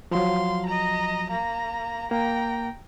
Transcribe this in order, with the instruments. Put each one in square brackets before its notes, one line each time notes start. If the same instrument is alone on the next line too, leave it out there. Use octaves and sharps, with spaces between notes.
[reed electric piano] F3 F#3 [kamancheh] F5 C6
[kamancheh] D#5 A#5
A#3 A#5
[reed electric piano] A#3 [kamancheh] G5 A#5